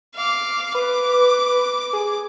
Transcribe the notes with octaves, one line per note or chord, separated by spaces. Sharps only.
F5 D6
B4 D6
G#4